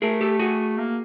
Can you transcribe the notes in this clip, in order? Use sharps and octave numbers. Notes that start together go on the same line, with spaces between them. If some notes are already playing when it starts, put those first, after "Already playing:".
A3 G#4 A#4
G4 A4
F#4 G#4
A#3